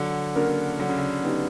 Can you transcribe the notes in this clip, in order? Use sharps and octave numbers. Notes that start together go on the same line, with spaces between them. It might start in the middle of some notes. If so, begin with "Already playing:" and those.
Already playing: D3 F#3
C#3 A#3 D4 F#4 A#4
D3 F#3
C#3
D3
B3 D#4 G4